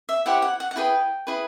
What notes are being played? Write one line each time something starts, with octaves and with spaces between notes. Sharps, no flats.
E5
E4 G4 C5 F#5
F#5
F#5
F#5
E4 G#4 B4 G5
E4 G#4 B4